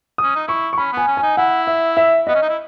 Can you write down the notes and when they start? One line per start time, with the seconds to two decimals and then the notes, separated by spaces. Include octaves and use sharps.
0.18 C#4 D#6
0.36 D#4
0.48 E4 C#6
0.73 C#6
0.78 C#4 B5
0.93 B3 G#5
1.08 C#4
1.17 G#5
1.23 D#4
1.37 E4 F#5
1.67 E5
1.97 E5
2.27 B3 D#5
2.35 C#4
2.42 D#4
2.49 E4